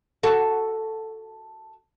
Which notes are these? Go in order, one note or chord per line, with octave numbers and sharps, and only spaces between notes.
F#4 A4